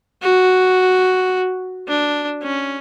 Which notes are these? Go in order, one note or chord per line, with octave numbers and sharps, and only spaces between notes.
F#4
D4
C#4